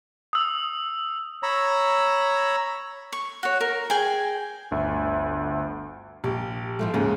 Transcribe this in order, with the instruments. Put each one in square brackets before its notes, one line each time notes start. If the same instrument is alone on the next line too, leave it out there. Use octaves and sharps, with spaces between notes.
[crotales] D#6 E6
[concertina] C#5 A#5 B5 E6
[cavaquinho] C#6
F#4 C#5
A#4
G#4 G5 G#5
[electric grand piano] G1 D2 E5
[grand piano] A#1 [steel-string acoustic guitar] G4
[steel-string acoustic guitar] A2 F3 A3
[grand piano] D#2 G#2 [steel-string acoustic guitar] C#3 G#4